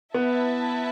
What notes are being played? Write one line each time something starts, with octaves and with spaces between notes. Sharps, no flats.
B3 E4 B4 E5 A5